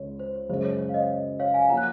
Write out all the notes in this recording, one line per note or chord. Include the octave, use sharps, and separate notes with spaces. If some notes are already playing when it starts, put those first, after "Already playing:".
Already playing: C#2 C#3 G#3 C#5
C5
C#5
F#2 C#3 G#3 C#4 C5
C#5
C#5
F5
C5 D#5
C#5 F5
F5 G#5
F3 A#3 F#5 A#5
F#6